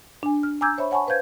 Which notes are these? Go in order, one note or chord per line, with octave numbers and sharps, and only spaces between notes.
D4 G#5
F6
G#5 A#5 D6 E6 G6 G#6
C5 C#5 E5 B5 C#6
C#5 F#5 G#5 A5 B5 C#6
B4 C5 F5 G6 G#6